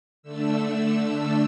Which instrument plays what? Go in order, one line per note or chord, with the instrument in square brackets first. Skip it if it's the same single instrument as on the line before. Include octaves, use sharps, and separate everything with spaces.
[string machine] D3 A3 D4 E6